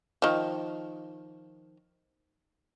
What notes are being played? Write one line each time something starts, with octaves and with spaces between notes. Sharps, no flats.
D#3 F3